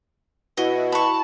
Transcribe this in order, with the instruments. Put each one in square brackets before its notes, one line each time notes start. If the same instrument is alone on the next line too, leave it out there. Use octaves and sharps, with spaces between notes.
[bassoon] B2 [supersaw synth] E4 F#4 [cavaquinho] D#5
[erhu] A5 [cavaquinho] B5 C#6